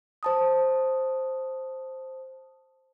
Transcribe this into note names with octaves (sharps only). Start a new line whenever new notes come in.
C5 A5 D#6